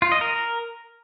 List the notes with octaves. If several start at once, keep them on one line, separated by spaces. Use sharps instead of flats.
F4
D#5
A#4